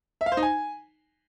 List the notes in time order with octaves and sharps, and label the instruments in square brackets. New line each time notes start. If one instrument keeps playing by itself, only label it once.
[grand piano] E5
F5
C5
D#4
G#5